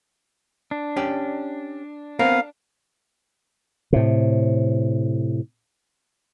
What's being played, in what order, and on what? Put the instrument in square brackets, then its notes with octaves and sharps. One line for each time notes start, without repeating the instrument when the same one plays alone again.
[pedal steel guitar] D4
[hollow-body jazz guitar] C#4 G4 D5
[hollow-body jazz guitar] B3 C4 A#4 [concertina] F5
[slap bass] A2 C3